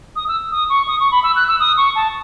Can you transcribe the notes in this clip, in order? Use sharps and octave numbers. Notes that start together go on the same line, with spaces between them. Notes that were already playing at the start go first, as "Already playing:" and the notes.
D#6
E6
D#6
C#6
D#6
C#6
B5
E6
F#6
E6
D#6
C#6
A5